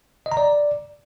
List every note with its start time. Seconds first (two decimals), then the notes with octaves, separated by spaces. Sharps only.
0.26 D#5
0.32 A#5
0.37 D5